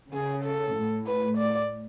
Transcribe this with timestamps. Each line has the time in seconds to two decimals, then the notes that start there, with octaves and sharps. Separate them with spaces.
0.13 C#3 G#4
0.44 A4
0.75 A2
1.07 B4
1.38 D5